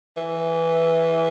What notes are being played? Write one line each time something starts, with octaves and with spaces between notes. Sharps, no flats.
E3